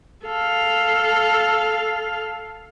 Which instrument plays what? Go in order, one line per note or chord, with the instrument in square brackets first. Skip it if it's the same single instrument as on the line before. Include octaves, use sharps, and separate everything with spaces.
[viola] A4 F5